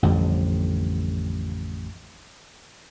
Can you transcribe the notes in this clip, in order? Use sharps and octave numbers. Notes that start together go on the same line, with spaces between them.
A1 F2 D3 G3